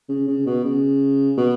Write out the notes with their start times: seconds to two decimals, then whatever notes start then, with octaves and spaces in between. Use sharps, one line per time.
0.09 C#3
0.28 C#3
0.46 B2
0.64 C#3
1.38 B2